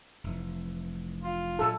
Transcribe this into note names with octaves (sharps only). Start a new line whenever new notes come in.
F1 E3
F4
A#2 F#3 A4